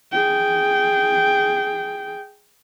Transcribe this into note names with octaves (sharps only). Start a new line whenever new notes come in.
G#4 G5